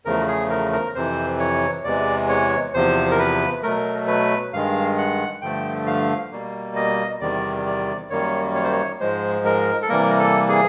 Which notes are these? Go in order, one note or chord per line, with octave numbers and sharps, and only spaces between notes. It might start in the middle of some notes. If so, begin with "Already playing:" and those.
E2 C#3 F3 A3 A#4
G#4
A#4
A#4
F2 C3 E3 C5
C#5
E2 C3 E3 G#3 D5
C#5
E2 C3 F3 C5
A#4
B4
B2 F#3 A3 A#4
B4
G2 D#3 G#3 F5
F#5
G2 D3 F3 A3 G5
F5
B2 G3 A#3
D#5
E2 C3 D#3 G3 D5
D5
F#2 D#3 G3 A#3 C#5
C#5
C5
C#5
G#2 F3 G#3 C5
A#4
A4
C3 E3 G3 A#3 A#4
A4
G#4